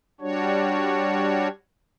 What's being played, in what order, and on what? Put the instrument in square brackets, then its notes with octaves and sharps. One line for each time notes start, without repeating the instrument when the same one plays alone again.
[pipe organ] G3 D4 F#4 C#5